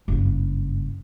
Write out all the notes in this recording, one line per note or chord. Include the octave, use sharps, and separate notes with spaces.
F#1 G2